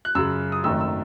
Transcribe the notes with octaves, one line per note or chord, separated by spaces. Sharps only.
F#6
F#2 C#3 F#3 E6
D#6
G#1 F#2 D#3 A3 E6
E6